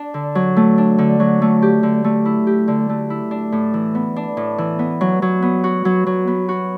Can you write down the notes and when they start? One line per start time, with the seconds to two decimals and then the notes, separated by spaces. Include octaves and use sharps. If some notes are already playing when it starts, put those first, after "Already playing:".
Already playing: D4
0.14 D3
0.35 F#3
0.57 A3
0.78 D4
0.98 D3
1.20 F#3
1.42 A3
1.62 G4
1.83 D3
2.04 A3
2.25 E4
2.47 G4
2.68 D3
2.89 A3
3.10 E4
3.31 D4
3.52 A2
3.74 E3
3.95 B3
4.16 D4
4.37 A2
4.58 E3
4.79 B3
5.01 F#3
5.22 F#3
5.42 B3
5.64 F#4
5.85 F#3
6.06 F#3
6.27 B3
6.49 F#4